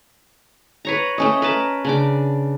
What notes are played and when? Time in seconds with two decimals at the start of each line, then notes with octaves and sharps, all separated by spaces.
0.85 B4 C#5 A#5
1.18 A3 C#4 D#5
1.42 A#4 B4 A5
1.85 C#3 D4 D6